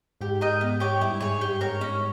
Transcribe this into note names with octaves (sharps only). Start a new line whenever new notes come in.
G#2 G4
A#4 D#5 G5
B3
G4 C#5 G5
G2 E4
G#2 G#4 C#5
G#2 G4
G#2 A#4 C#5
C#4